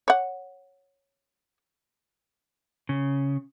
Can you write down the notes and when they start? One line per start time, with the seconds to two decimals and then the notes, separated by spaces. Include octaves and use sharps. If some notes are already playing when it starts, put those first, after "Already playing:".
0.08 C#5 F#5
2.89 C#3